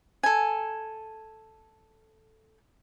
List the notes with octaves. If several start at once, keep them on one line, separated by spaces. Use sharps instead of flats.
A4 G#5